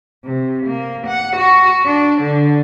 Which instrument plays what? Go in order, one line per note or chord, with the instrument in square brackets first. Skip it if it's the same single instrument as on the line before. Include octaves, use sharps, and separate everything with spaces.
[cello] C3
A#3
F#5
F#4
D4
D3